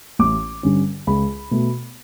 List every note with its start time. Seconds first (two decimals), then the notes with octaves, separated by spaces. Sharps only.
0.19 A1 D6
0.63 G2 D3 G3 C#4
1.07 C#2 B5
1.51 B2 A3